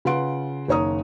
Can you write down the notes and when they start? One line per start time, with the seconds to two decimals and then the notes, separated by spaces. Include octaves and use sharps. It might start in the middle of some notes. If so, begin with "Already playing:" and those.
0.05 C#3 F4 B4 F#5 C6 D7
0.68 F#1 D#3 C#5 A#5 D#6